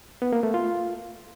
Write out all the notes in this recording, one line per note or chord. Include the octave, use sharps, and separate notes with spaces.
B3
A#3
A3
F4